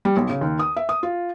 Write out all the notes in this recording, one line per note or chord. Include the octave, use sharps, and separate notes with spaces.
G3
B1
C#3
D#2
D#6
E5
D#6
F4